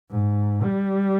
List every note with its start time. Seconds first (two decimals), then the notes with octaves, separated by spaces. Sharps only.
0.11 G#2
0.63 G3